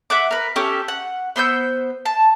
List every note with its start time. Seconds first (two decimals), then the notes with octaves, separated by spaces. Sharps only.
0.10 E5 F#5 D6
0.31 A#4 B4
0.56 C#4 G4 A4
0.88 F#5
1.36 B3 C5 E6 G6
2.05 A5